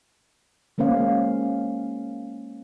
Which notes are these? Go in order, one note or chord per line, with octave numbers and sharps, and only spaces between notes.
G#3 A#3 C#4 C5 F5